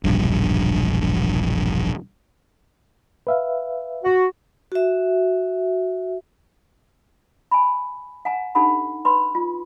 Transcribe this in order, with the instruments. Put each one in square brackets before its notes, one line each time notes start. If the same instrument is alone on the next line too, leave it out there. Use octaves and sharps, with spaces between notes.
[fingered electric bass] E1 A#1 G2
[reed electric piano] B4 E5 F5
[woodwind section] F#4
[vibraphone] F#4 E5
[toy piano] G#5 B5
F#5 G#5 A#5
D4 D#4 G4 A4 F#5 B5
B4 B5 C6
F4